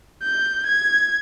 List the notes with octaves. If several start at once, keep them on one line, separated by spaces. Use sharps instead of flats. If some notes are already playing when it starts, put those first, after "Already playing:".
G6
G#6